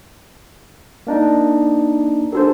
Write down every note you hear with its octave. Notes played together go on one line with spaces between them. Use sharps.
A#3 D4 D#4
D4 F#4 G4 A4 A#4 C5